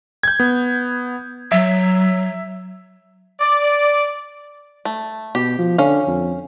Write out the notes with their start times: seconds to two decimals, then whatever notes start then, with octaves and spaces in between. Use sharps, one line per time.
0.23 G6 G#6
0.40 B3
1.52 F#3 E5
3.40 D5
4.85 A3
5.35 B2 G4
5.59 F3
5.78 D3 C#4 F5
6.08 F2